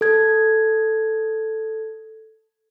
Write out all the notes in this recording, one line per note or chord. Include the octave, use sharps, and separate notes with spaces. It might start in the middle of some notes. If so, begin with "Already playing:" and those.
A4 G#6